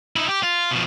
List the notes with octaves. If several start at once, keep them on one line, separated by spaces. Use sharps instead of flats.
D#4 E4
G4
F4
B2 F3